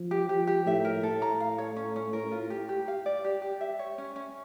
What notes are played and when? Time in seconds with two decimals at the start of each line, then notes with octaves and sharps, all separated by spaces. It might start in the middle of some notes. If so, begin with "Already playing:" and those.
Already playing: F3
0.11 G4
0.29 F3 G4
0.47 G4
0.66 A2 E5
0.85 A#4
1.03 A2 A4
1.22 A#5
1.40 F5
1.58 C#5
1.76 C#4
1.96 C#4
2.13 A#4
2.31 F4
2.50 G4
2.69 G4
2.88 F5
3.06 D5
3.25 G4
3.42 G4
3.61 E5
3.79 C#5
3.98 C#4
4.16 C#4